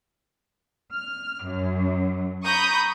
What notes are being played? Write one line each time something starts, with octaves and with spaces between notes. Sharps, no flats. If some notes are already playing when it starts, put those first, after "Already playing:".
F6
F#2
A#5 B5 C#6 D#6 G6